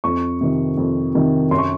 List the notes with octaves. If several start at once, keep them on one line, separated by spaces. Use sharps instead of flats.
F2 C#6
C3 D#3
F2
C3 D#3
F#2 C6
C#6